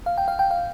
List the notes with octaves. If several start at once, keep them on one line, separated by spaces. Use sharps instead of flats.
F5
G5
F5
G5
F5